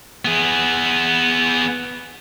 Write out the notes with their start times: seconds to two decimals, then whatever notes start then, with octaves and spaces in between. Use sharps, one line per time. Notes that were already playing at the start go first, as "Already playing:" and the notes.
0.25 B3 G#4